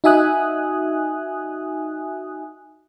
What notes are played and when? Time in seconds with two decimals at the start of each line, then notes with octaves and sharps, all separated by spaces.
0.04 D#4 F#4 E5 G#5 D#6 F#6